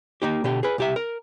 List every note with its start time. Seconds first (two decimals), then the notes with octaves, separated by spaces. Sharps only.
0.22 A#3 D#4 G4
0.44 B2 D3 G4
0.63 G#4 B4
0.78 C2 G4 E5
0.96 A#4